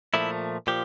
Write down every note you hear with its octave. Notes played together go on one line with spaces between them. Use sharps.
A#2 F3 A3 E4
A#2 F3 G4